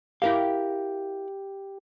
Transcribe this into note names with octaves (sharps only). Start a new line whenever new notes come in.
E4 G4 A#4 F5